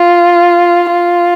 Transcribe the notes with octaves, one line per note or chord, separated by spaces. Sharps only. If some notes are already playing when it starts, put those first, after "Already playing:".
Already playing: F4
F4